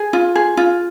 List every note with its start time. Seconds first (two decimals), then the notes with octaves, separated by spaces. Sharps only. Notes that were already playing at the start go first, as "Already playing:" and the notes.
Already playing: G#4
0.13 F4
0.36 G#4
0.57 F4